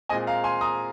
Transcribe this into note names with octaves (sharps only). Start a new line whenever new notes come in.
A#2 G#3 C4 D#5 G#5
F5 A#5
G#5 C6
A#5 D#6